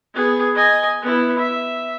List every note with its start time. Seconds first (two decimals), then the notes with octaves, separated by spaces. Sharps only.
0.14 B3 G#4
0.55 D#5 G#5
1.02 B3 E4
1.38 E5